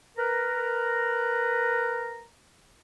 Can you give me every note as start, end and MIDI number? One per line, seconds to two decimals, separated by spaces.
0.17 2.24 70
0.17 2.24 71
0.17 2.24 82